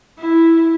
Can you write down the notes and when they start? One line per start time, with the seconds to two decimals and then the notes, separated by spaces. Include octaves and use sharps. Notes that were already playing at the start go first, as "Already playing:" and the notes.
0.19 E4